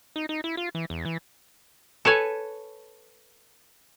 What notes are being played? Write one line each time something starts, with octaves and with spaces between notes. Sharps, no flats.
D#4
D#4
E4
F4
E3
E2
E3
A4 B4 C#5 G#5